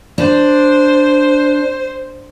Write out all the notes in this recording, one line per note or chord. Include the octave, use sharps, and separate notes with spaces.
D4 C5